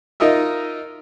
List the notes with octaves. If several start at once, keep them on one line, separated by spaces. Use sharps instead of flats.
D#4 F4 A#4 D#5 E5